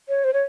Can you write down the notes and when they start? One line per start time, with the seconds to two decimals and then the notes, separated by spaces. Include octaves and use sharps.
0.09 C#5
0.24 C5
0.33 C#5